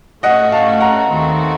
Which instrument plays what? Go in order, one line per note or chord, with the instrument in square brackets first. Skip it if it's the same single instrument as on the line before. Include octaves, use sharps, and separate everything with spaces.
[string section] A2 A3 C#4 F#4 [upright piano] D#5 F#5
[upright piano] F5 A5
F#5 A#5
[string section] D#2 D#3 A3 C4 F#4